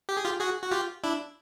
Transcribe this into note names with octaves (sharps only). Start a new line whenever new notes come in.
G4
G#4
F4 G4
F#4 G#4
F#4
F4 G4
D4 E4